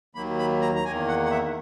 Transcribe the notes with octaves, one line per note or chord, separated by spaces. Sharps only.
D#2 D#3 F#3 A#3 B5
B5
A#5
A#5
E2 D#3 A#3 G#5
F#5
F#5
E5